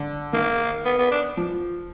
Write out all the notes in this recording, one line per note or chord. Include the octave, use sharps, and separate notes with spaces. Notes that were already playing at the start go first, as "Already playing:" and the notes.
Already playing: D3
D#3 A#3
B3
B3
D4
F3